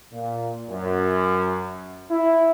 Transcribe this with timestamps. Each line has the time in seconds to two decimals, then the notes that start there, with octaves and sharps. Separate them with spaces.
0.13 A#2
0.69 F#2
2.10 E4